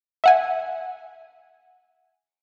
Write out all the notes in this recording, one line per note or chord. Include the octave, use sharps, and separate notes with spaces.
E5 F#5 G#5